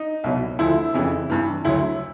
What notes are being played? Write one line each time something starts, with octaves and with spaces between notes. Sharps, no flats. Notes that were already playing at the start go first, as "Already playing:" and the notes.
Already playing: D#4
C2 B2 F#3
D2 D3 F3 E4
F2 C#3 E3
G2 E3
D2 D3 F#3 E4